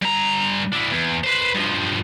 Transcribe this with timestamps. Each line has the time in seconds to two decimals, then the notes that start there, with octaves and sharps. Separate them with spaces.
0.02 G2 A#5
0.72 D4 E4
0.91 E2
1.24 B4 C5
1.55 G2 F3